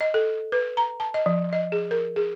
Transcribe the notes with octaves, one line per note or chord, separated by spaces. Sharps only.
D#5
A4
B4
A#5
A5
D#5
F3
D#5
G#4
A#4
G#4